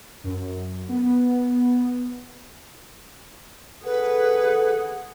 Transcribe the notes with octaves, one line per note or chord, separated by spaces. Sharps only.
F#2
B3
G#4 A4 B4 F#5